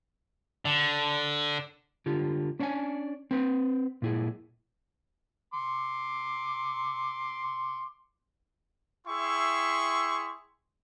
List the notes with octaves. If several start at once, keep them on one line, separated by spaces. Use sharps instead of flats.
D3
D3 F4 G4
C#4 D4 C#5 F#5 G#5
C4 B4 C5
A#2 E4 G#4
C6 D6
E4 G#4 E5 G5 C6 C#6